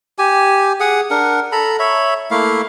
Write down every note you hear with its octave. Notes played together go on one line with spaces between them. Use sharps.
G4 G#5
G#4 F#5 D#6
D4 A#4 F#5
A4 A#5 B5
C#5 E5 B5
A3 A#3 E4 F5